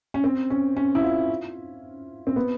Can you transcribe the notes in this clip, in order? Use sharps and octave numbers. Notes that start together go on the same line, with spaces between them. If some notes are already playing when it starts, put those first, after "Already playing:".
C#4
C4
C#4
C#4
E4
F4
C4
B3